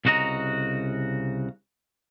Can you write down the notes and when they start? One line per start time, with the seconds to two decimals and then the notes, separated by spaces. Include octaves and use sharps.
0.05 C2 C#3 F#4 D#5 A#5